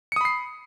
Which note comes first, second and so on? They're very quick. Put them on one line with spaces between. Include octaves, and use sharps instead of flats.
C#7 D#6 B5 C7